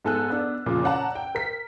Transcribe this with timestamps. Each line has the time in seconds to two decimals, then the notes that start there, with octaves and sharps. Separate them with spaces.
0.05 G#2 B3 A4 G#5 E6 F#6
0.30 B3 D4
0.66 F2 A#2 C#3
0.83 C#4 D5 F#5 A5 A#5
1.15 G5
1.35 A#4 B6